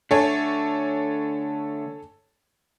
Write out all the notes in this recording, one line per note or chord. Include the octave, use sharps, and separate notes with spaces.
D3 A3 D4 A4 C#5 G#5